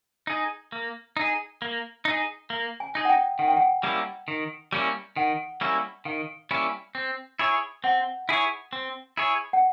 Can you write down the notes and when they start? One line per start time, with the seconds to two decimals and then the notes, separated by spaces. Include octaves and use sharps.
0.27 D#4 G#4
0.72 A#3
1.17 D#4 G#4
1.62 A#3
2.05 D#4
2.10 G#4
2.50 A#3
2.80 G#5
2.95 D#4 G#4
3.05 F#5
3.10 G5
3.39 D#3 F#5
3.48 G5
3.57 F#5
3.83 G3 A#3 C#4 E4
4.28 D#3
4.72 G3 A#3 C#4 E4
5.16 D#3 F#5
5.61 G3 A#3 C#4 E4
6.05 D#3 F5
6.51 G3 A#3 C#4 E4
6.95 C4
7.39 E4 G#4 C#5
7.84 C4 F#5
8.29 E4 G#4 C#5
8.73 C4
9.17 E4 G#4 C#5
9.53 F#5